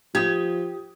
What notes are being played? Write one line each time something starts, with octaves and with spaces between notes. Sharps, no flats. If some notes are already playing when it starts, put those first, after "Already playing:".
F3 G4 D#6 G#6